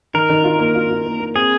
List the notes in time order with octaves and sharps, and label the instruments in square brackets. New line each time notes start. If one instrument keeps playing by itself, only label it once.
[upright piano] D#3 [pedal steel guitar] A#4
[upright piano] D#3
F4
A#3
F4
F4
A#3
A#3
[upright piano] C4 [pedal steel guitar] G#4